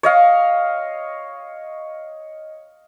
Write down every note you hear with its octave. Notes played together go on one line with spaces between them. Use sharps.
C#5 D#5 F5